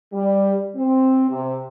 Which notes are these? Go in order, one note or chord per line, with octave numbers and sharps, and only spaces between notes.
G3
C4
C3